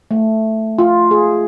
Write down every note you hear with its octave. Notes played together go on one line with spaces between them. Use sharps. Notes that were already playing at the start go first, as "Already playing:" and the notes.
A3
F4
G#4